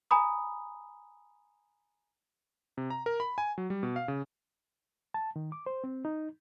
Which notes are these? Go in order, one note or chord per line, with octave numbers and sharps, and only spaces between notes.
G#5 A#5 B5 D#6
C3
A#5
A#4
B5
G#5
F#3
G3
B2
F5
C#3
A5
D#3
D6
C5
C4
D#4